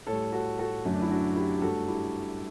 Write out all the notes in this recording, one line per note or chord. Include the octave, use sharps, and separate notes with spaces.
A2 G3 A4 C#5
F#4 A4
F#4 A4
F#2 D3 F#3 A3
D4
E4
D4 F#4
E4 G4
G4
G2 F#3 A3 F#4 A4
E4 G4